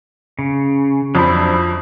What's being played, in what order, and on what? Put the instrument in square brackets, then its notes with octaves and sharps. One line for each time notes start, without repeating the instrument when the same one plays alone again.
[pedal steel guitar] C#3
[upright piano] F2 C5 B5 [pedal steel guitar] F#3 D4 E4